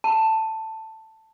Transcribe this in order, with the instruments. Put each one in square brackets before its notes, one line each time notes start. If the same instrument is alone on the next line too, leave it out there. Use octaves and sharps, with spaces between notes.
[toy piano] A5